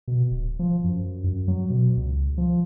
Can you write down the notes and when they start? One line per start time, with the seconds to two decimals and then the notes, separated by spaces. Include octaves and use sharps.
0.08 B2
0.31 D1
0.59 F3
0.84 F#2
1.24 F#2
1.48 F#3
1.70 B2
1.97 C#2
2.38 F3